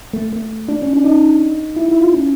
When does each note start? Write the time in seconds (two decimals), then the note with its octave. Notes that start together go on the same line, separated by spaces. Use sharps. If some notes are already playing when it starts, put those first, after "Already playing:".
0.13 A3
0.33 A3
0.68 D4
0.82 C#4
0.93 D4
1.04 D#4
1.76 E4
1.88 E4
2.01 F4
2.13 C#4